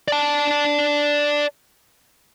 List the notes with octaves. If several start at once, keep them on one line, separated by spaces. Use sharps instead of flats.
D5 A5